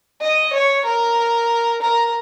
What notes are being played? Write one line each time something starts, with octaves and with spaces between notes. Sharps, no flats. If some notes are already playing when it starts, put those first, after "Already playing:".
D#5
C#5
A#4
A#4